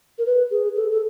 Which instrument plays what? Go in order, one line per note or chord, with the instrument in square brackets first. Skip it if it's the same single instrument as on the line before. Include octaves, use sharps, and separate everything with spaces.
[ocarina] A#4
B4
G#4
A4
A4